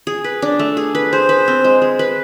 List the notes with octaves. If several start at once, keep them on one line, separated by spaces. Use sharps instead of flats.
G#4
B4
D4
A3
G#4
B4
G#4 C5
B4
C4
G#3
G#4
B4